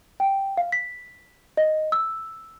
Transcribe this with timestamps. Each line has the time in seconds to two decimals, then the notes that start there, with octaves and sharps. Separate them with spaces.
0.20 G5
0.57 F5
0.72 B6
1.57 D#5
1.92 E6